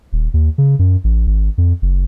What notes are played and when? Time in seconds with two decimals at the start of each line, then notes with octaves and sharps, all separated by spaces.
0.13 D#1
0.34 D#2
0.58 C#3
0.79 F#2
1.04 A1
1.27 G#1
1.58 F2
1.82 F#1